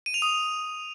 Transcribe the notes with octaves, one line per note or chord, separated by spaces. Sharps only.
D#7
F7
D#6